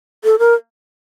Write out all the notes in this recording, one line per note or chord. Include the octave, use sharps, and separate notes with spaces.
A4
A#4